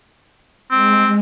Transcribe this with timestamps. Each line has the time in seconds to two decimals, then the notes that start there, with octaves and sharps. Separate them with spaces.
0.71 G#3 C4